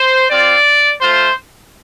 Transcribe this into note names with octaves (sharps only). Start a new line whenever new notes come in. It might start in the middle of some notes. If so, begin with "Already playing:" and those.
Already playing: C5
C4 F4 D5
A3 F4 C5